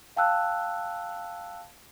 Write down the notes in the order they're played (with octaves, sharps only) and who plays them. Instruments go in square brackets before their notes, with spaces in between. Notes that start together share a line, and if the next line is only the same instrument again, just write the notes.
[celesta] F5 G5 A5 E6 F#6